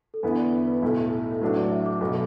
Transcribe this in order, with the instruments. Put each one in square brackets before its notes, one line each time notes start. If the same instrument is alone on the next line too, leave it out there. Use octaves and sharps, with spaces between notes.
[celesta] A4
[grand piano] E2 D3 B3 E4 [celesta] B4
[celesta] D5
B4
B4
[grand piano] B1 A2 A3 E4 [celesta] A4
[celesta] A4
[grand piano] A2 F#3 D4 [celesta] B4
[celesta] D5
E5
D6
[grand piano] B1 B2 F#3 [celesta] D6